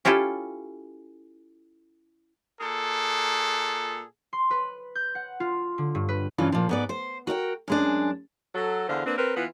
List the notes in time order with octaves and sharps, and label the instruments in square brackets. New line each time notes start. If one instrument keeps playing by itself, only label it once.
[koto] C#4 E4 F4 G4 A4
[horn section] A#2 G#4 A4
[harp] C6
B4
G6
F#5
F4
D3
G2
B4
[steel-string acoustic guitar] G2 C#3 E3 F4
A#2 F3
G#2 B3 D5
C5
F#4 A#4 D#5 G5
F#2 G#3 D4
[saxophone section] F#3 A4
E2 D3 C5 F5
A#3 C4 D4 B4
C4 A#4 B4
E3 B3 F4 B4